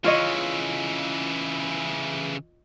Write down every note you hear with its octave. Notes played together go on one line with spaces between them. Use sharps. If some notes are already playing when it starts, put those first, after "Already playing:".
C#3 E3 F4 C#5 D#5